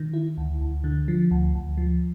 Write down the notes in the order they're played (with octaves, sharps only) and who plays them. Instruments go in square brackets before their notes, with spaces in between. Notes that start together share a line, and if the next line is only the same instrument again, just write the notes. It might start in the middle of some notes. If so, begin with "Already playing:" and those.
Already playing: [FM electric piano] D#3
E4
D2
D2
D3
F3
D2
D2
F3